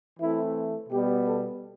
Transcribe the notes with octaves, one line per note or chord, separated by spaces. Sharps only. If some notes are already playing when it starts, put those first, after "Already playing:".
E3 A3 C4 E4
B2 G3 B3 G4
A4